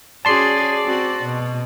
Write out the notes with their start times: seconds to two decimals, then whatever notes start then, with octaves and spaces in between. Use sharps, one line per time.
0.25 C#4 F#4 G#4 D5 A5 C6 C7
0.84 C4 F#4
1.24 B2